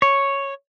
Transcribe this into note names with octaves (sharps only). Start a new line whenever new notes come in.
C#5